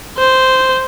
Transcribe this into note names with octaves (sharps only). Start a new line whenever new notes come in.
C5